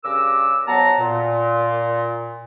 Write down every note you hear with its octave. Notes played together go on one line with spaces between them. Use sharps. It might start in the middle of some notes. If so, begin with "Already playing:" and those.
G2 C#3 A#4 D6 E6
F2 F#3 B3 F#5 A5 A#5
A#2